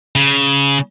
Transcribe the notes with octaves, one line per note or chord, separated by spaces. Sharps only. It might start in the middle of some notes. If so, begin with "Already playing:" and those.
C#3